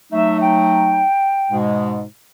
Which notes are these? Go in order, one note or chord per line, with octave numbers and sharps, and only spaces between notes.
F#3 A3 D#4 E5
G5
G#2 B2 G#3